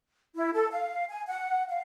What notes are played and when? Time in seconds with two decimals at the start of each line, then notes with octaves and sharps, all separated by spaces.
0.35 E4
0.53 A4
0.71 F5
1.10 G#5
1.27 F#5
1.68 F5